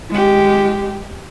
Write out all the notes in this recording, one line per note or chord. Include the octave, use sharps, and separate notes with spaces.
G#3 G4